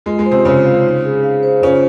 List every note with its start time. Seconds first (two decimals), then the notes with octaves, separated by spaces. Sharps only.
0.06 G#3 F4
0.19 G#3
0.25 C5
0.32 C3 C4
0.45 C#3 C#4 F4
0.65 F5
0.85 D#4
1.04 G#4
1.23 F5
1.43 C5
1.62 C#3 C#4 F4